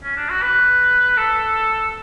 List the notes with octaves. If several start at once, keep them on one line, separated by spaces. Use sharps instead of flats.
C#4
D4
F#4
B4
A4